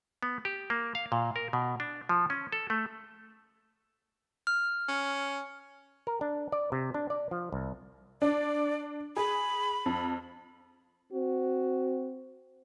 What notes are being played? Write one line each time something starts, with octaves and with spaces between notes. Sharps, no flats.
B3
G4
A#3
F5
A#2
A#4
B2
D4
F3
C#4
A4
A3
F6
C#4
A#4
D4
D5
C3
D4
D5
F3
C2
D4 D5
G#4 B5
F2
C4 F#4